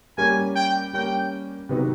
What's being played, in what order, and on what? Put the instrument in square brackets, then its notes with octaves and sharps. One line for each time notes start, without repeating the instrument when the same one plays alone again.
[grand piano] G3 A#3 C#4 [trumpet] G#5
[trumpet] G5
[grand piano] G3 A#3 C#4 [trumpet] G5
[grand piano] C3 D#3 F#3 B3 D#4